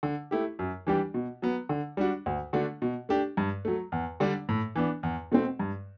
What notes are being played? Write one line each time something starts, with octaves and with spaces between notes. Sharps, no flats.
D3
A3 E4 G4
F#2
E3 G3 D4 G4
B2
F#3 B3
D3
G3 D4 F#4
D2
D3 A3 D4 F#4
B2
A3 D4 G4
G2
F#3 A3
E2
D3 G3 D4
A2
E3 B3 D4
E2
B2 A3 C4
G2